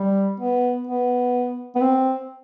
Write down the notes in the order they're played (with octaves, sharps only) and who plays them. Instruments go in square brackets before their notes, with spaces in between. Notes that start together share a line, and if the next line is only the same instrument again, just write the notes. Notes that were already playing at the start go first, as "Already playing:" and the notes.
Already playing: [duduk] G3
B3
B3
B3
C4